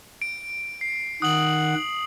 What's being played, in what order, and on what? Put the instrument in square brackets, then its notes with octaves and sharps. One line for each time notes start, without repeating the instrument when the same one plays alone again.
[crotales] D7
C7
[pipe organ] D#3 F#5 [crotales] D#6 F#7